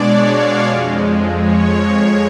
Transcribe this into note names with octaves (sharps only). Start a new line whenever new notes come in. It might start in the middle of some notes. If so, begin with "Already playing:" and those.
Already playing: B2 G#3 D4 C#5 D5
F5
F2 F3 G#3
C#5